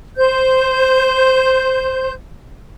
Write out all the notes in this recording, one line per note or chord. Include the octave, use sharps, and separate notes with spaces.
C5 G6